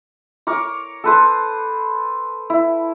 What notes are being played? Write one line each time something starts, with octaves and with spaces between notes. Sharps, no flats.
A#4 C#5 D6
A4 B4 C5
E4